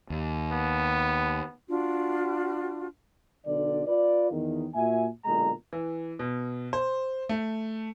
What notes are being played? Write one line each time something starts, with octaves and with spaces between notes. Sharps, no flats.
D#2
B3
D4 F4 F#4
B1 D3 D5
F4 B4 D5
E2 D#3
A#2 F#4 E5 G#5
B1 A#2 D3 G#3 A#5
E3
B2
C5
A3